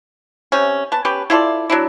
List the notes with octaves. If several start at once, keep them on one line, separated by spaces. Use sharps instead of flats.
C3 C#4
B3 A5
B3 C#4 G4 B4
E4 F4 A4 D5
F#3 D4 E4